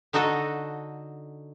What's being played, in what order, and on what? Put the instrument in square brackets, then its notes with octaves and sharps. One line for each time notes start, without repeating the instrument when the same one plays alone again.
[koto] D3 D#4 F#4 A4 D#5